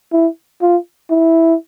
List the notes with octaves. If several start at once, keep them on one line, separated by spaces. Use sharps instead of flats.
E4
F4
E4